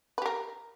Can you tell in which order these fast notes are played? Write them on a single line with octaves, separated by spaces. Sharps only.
B4 G4 A#4